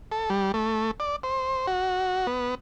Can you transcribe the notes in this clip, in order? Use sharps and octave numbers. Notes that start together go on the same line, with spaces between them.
A4
G3
A3
D5
C5
F#4
B3